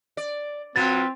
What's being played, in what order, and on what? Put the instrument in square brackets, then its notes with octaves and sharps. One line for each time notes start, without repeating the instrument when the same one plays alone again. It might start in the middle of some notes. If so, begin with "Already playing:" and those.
[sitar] D5
[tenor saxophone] F#3 [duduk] C4 [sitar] F4 B4 [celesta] A6